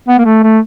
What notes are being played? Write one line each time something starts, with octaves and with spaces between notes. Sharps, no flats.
B3
A#3
A3
A3